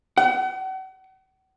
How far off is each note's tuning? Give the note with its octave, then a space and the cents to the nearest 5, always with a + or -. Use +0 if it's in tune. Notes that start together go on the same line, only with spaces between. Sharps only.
F#5 +40